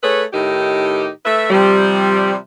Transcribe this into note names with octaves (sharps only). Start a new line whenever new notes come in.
A3 G#4 A4 B4 C#5
A2 D#3 D#4 G4
A3 B4 E5
C3 F3 G3